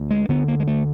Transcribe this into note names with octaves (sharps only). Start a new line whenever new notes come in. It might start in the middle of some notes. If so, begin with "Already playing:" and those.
Already playing: D2
G#3
D2 D3 B3
A#3
G#3
A3